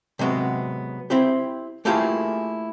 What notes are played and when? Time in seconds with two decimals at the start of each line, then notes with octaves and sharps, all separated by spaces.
0.19 C3 F#3 G#3 B3
1.10 C4 E4 G4
1.85 A3 A#3 E4 F4 G4 G#4